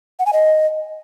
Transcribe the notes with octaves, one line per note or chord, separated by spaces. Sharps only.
F#5
G#5
D#5